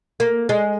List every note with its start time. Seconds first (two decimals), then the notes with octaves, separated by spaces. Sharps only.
0.20 A#3
0.49 G#3